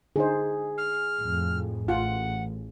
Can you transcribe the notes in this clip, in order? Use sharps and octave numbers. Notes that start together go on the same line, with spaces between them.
D3 D#4 G#4 C5
F6
F2 A2
A1 F4 F#5